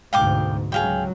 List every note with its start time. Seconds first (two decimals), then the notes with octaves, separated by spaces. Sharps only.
0.13 D2 G#2 B2 F5 G5 D6
0.72 C#2 F#3 G#4 F5 G5